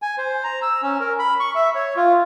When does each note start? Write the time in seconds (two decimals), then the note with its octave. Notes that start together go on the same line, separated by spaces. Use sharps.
0.02 G#5
0.18 C5
0.44 A#5
0.62 E6
0.83 C#4
1.00 A#4
1.19 B5
1.40 C#6
1.55 E5
1.75 C#5
1.96 F4